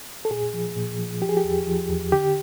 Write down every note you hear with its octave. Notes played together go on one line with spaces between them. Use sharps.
A4
A#2 G#4
F3
A#2
F3
F3 G4
G#4
G4
E2
F3
E2
D3 G4